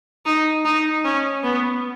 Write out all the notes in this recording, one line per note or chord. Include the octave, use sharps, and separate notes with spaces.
D#4
D#4
C#4
B3